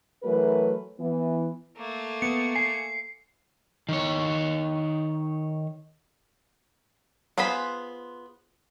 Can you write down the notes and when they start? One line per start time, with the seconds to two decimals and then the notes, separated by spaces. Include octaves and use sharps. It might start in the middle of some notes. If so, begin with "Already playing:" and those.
0.23 E3 F#3 A3 F#4 A#4 B4
0.99 E3 B3
1.77 A3 A#3
2.22 B3 C#7
2.55 G#5 C7
3.89 D#3 C#5
7.38 B3 F4 G#4 C5 B5